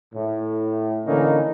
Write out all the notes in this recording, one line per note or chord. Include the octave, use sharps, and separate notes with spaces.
A2
D3 E3 A#3 C#4 D#4